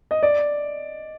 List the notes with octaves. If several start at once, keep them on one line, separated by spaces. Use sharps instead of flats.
D#5
D5